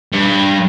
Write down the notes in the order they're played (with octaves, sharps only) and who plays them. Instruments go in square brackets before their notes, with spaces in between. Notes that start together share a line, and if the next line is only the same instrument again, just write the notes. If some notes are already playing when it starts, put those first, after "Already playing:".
[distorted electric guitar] G2